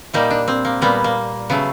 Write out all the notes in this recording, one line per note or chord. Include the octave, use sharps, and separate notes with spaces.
A#2 G3 A#3 D#4
D4
C4
A#3
A#2 G3 A#3 B3
A#3
C#3 F#3 A3 B3